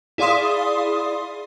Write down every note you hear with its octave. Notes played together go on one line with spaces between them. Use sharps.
E4 G#4 D5 F5 C6 D#6